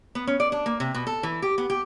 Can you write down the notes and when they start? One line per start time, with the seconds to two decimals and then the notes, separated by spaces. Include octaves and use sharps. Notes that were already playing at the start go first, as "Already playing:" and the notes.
0.15 B3
0.27 C#4
0.40 D5
0.52 D4
0.66 A#3
0.80 C3
0.94 B2
1.07 A4
1.23 E3
1.42 G4
1.58 B3
1.70 G4